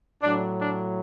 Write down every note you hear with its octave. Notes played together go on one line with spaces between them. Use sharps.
A2 F#3 D4
D4